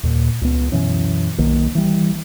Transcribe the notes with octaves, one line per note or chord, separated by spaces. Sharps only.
D#2 A#2
C#2 B3
F#2 B2 E3 C#4
B1 D#3 A#3
E3 G3